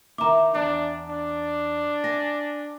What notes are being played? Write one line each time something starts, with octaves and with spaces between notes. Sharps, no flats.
D#3 E4 A#5 D6
E2 D4
D4
G#5 A#6